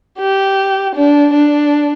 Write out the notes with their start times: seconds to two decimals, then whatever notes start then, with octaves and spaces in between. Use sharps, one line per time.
0.19 G4
0.95 D4
1.33 D4